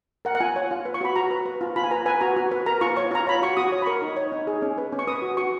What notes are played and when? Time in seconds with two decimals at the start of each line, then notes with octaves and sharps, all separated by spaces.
0.25 A#4 F#5
0.35 F#5
0.40 F4 G#5
0.56 C#5
0.71 F4
0.85 B4
0.94 C#6
1.01 F#4 B5
1.16 F#4 A#5
1.31 B4
1.46 B4
1.61 F4
1.76 F4 B5
1.84 G#5
1.91 B4 A#5
2.06 B4 G#5
2.21 F#4 A#5
2.37 F#4
2.51 B4
2.66 A#4 A#5
2.81 F4 C#6
2.97 C#5 C#6
3.11 F4 A#5
3.27 C#5 B5
3.42 F#4 C#6
3.57 F#4 D#6
3.72 C#5
3.82 B5
3.86 A#4 C#6
4.02 D#4
4.17 C#5
4.32 D#4
4.47 G#4
4.62 C#4
4.78 B4
4.92 C#4
4.99 C#6
5.07 B4 D#6
5.22 F#4
5.37 F#4 C#6